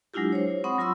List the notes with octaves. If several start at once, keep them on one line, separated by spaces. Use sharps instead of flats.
F#3 G#3 D4 E4 F4 G4
C5 C#5
C4 F#5 B5 C#6 D#6
F#3 F4 B5 C6 E6